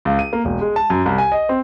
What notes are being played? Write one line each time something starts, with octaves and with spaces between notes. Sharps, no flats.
C#2
D#7
A#3
E1
G#3
A5
F#2
C2
G#5
D#5
C4